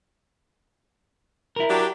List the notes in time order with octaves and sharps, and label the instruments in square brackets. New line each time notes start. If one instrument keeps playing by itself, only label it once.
[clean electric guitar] E4 A#4
[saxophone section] F#3 D4 G4